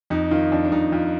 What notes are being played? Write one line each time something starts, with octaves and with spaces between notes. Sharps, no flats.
F2 D#4
D#3 F4
F2 D4
D4
F2 D#4
F2 F4